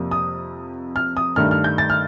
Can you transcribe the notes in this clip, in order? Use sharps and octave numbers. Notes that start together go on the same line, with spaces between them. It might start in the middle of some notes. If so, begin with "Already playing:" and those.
Already playing: F2 C3 G3 A#3
D#6
F6
D#6
G2 D#3 A3 D4 F6
F6
G6
A6
F6